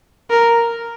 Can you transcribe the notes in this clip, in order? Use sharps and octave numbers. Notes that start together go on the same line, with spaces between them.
A#4